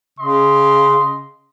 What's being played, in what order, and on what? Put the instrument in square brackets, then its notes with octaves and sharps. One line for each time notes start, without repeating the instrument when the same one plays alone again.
[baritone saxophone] C#3 [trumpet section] D#5 C6